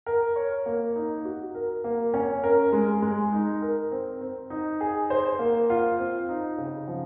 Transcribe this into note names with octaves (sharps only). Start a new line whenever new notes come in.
A#4
C#5
A#3
D#4
F#4
A#4
A#3
C#4
A#4
G#3
G#3
D#4
A#4
C4
C4
D#4
G#4
C5
A#3
F4
C4
D#4
C#3
F3